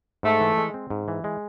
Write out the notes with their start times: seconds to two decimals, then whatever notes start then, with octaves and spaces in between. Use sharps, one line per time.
0.23 G#2 A3
0.40 E3
0.57 G#3
0.74 C4
0.90 G#2
1.08 E3
1.24 G#3